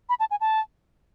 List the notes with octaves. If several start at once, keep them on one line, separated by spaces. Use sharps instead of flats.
B5
A5
G#5
A5